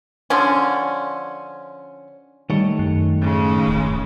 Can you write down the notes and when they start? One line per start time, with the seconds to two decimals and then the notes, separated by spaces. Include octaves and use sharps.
0.30 D3 F3 C#4
2.50 D#3 G3 A3 C#5
2.79 F#2
3.21 A2 C#3 G#3
3.67 D#1